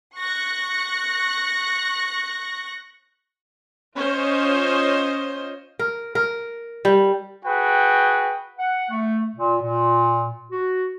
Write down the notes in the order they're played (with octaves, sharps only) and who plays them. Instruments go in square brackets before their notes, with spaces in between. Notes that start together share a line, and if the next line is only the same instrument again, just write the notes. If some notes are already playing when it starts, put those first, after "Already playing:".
[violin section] C#6 F#6 A#6 C#7
[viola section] C#4 F4 C5 D#5
[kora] A#4
A#4
G3
[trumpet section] F#4 G#4 B4 G5
[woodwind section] F#5
A3
A#2
A#2
F#4